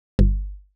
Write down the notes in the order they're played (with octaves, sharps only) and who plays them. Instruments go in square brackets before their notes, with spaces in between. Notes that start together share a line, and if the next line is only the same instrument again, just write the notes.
[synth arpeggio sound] G1